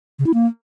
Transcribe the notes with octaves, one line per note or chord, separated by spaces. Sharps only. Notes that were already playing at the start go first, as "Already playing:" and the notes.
C#3
E4
A#3